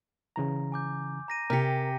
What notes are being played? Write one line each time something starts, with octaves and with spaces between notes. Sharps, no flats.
C#3 E3 A#5
G#5 D6 G6
A#5 A#6 D#7
C3 G4 A#4 G6 B6 C#7